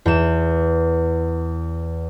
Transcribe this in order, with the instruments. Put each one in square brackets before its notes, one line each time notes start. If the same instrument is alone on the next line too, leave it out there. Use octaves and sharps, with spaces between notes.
[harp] E2 E7